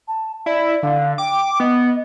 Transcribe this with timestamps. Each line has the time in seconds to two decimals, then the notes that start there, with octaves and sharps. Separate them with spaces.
0.08 A5
0.46 E4 D5
0.83 D3 F5
1.18 G5 D6
1.60 B3 D#5